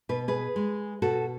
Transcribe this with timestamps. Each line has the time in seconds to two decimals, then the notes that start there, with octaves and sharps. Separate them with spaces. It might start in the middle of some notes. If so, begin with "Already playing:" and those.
0.09 B2 B4
0.28 G#4 B4
0.56 G#3
1.02 B2 F#4 A4